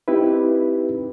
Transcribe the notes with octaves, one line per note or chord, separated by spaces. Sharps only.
C4 D#4 E4 G4 B4